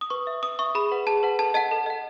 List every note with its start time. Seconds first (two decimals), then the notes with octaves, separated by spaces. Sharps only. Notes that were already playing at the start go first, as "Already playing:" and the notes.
0.01 D#6
0.10 B4 C#6
0.27 E5
0.43 B4 D#6
0.59 E5 C#6
0.75 G#4 B5
0.91 B4 F#5
1.07 G#4 A5
1.23 B4 F#5
1.39 A4 A5
1.54 D#5 F#5 A5
1.71 A4
1.86 D#5 F#5